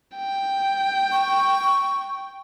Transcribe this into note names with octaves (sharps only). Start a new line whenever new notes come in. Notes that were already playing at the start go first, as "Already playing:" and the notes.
G5
C#6